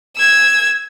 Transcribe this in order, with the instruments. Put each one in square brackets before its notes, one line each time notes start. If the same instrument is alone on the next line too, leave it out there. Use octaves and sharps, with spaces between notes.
[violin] E6 G#6